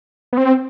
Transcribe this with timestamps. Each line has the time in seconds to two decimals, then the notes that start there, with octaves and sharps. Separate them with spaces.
0.33 B3
0.37 C4